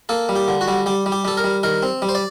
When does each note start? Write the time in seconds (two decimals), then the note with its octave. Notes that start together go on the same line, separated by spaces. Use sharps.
0.09 A#3 A4
0.29 G3
0.36 G4
0.48 D3
0.61 F#4
0.68 G3
0.86 G3 G4
1.06 G3
1.12 G4
1.25 G3 A4
1.37 A#4
1.44 G3
1.63 D#3 A#4
1.83 C4
2.02 G3
2.09 C5
2.15 D5